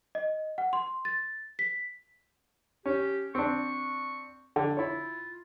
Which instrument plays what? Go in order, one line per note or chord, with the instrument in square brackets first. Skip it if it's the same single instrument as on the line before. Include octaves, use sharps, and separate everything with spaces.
[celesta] D#5
F#5
C6
A6
B6
[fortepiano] C#4 [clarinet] G4
[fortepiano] C4 D4 [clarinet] C#6
[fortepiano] D3
[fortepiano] E4 C#5 [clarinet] F4